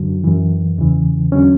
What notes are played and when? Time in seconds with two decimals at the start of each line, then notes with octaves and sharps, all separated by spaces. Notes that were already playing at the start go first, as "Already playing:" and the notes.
Already playing: F#2 D3 F#3
0.24 F#2 E3
0.78 E2 C#3 E3
1.32 E2 D3 F#3 C#4